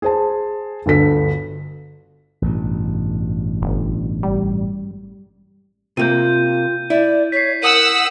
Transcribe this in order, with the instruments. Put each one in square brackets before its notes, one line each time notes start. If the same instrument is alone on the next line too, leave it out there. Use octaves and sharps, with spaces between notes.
[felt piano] G#4 C5 A5
G1 D2 A4 B6
[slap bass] A1 G2 B2
[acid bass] G1
G3
[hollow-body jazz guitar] C3 A#3 [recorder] F4 [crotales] G6 D#7
[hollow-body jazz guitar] E4 [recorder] D5
[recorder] C#5 [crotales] B6 C7
[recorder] A#4 [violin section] F#5 E6 [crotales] D#6 D#7